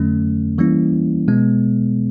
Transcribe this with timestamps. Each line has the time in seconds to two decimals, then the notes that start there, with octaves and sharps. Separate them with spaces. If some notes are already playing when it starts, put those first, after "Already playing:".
Already playing: F2 D3 F#3 A3 C#4
0.58 E3 G3 A#3 C#4 E4
1.28 B2 G#3 B3